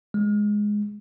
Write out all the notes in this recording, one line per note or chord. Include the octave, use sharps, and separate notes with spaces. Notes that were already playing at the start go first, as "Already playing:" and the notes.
G#3